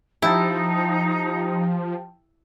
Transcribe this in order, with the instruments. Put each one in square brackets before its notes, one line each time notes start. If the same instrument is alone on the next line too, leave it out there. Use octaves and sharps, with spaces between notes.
[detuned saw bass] F3 [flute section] D#4 [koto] E4 [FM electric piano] G4 G5 A5